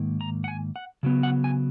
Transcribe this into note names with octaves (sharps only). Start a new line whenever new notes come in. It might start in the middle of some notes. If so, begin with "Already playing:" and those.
Already playing: G#2 D#3 A#3
A#5
F#5
G#5
F#5
C#3 F#3 B3
F#5
G#5